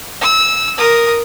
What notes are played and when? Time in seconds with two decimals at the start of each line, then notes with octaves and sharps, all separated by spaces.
0.21 E6
0.77 A#4 D#6